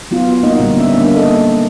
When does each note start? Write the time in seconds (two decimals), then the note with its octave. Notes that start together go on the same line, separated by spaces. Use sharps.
0.11 F#3 B3 F4
0.43 A#3 D#4 D#5 F#5
0.59 A#2 D3 G3
0.76 A#3 B3 C#4 E5
0.96 A#3 D4
1.15 D4 A4 D#5